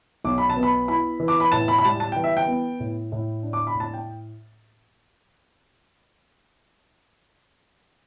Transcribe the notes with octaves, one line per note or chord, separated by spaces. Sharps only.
B1 D6
B5
A5
B3
B5
E4 B5
E3
D6
B5
A2 A5
B5
B5
G3 A5
A5
E3 G5
E5
G5
B3
A2
A2
D4
D6
B5
A2
A5
G5